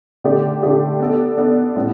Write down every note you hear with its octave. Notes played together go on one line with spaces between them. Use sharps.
D3 A3 D4 G4 D5
D3 A3 D4 G4 D5
B3 D4 A4 D5
B3 D4 A4 D5
A2 G3 B3